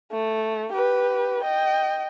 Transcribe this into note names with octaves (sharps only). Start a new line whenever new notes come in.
A3
G4 B4
D#5 G5